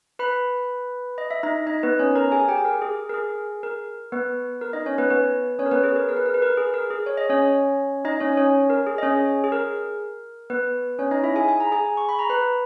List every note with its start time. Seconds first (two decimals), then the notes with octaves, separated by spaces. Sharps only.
0.19 B4 B5
1.18 D#5
1.31 E5
1.43 D#4 D#5
1.67 D#4 D#5
1.83 B3 B4
1.99 C#4 C#5
2.15 A#4 A#5
2.32 G#4 G#5
2.48 G4 G5
2.65 A#4
2.82 G#4
3.09 A#4
3.14 G#4
3.63 A#4
4.12 B3 B4
4.61 A#4
4.73 D#4 D#5
4.86 C#4 C#5
4.98 B3 B4
5.10 B3 B4
5.59 C#4 C#5
5.66 A#4
5.71 B3 B4
5.84 G#4
5.96 A#4
6.09 A#4
6.17 B4
6.26 A#4
6.34 B4
6.42 A#4
6.57 G#4
6.74 A#4
6.90 G#4
7.06 C#5
7.17 D#5
7.29 C#4 C#5
8.05 D#4 D#5
8.20 C#4 C#5
8.37 C#4 C#5
8.70 A#4
8.87 G#4
8.98 D#5
9.03 C#4 C#5
9.44 G#4
9.52 A#4
10.50 B3 B4
10.99 C#4 C#5
11.11 D#4 D#5
11.23 E4 E5
11.36 G#4 G#5
11.48 G#5
11.60 A#5
11.72 G#4 G#5
11.97 C#6
12.09 B5
12.19 A#5
12.30 B4 B5